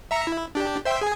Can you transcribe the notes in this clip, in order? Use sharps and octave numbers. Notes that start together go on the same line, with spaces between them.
E5 A#5 C#7
E4
D4 G4
C5 E5 G5
G#4 G#5